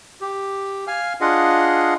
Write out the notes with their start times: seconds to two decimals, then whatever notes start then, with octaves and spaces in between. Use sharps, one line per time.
0.21 G4
0.87 F5 G#5 F6
1.21 D4 F4 G#4 D#5 F5 F#5